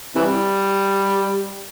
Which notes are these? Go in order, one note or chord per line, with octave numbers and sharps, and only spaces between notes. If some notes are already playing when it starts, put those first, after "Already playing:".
C3 E3 G3